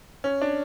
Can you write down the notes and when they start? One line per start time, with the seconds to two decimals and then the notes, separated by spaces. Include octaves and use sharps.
0.24 C#4
0.41 D4